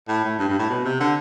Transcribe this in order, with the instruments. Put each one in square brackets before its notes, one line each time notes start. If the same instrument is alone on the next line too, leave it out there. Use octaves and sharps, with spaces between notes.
[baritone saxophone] A2
A2
G2
G2
A2
B2
C3
D3